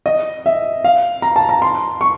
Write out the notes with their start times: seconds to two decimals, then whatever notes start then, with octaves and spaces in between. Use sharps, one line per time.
0.06 D#5
0.46 E5
0.84 F5
1.22 A#5
1.36 A5
1.49 A#5
1.62 C6
2.01 C#6